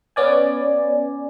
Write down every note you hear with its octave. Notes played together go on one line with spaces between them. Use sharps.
B3 C#4 D5 G#5